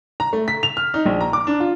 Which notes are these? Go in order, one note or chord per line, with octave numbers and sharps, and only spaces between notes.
A#5
A3
B6
F7
F6
D#4
A#1
A#5
D6
D4
F4